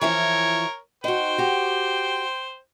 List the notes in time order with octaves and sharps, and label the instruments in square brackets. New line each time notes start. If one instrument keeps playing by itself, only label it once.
[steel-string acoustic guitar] E3 F3 E4 [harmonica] A#4 C#5
[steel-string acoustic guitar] D#4 F#4 [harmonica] C5 G5
[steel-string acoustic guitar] F#4 G4